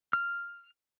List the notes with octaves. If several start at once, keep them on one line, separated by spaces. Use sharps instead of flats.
F6